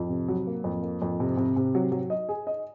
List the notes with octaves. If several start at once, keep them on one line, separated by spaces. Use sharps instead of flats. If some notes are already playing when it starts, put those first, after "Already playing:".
Already playing: F2
C3
F#3
A#3
F2
A#3
F2
C3
C3
C3
F#3
F#3
D#5
G#4
D#5